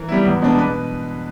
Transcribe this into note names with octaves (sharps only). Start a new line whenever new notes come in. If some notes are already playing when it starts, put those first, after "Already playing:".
Already playing: E3 A#4
G3 B3 E4
E2
B2 G#3 B3 D4
B2 B4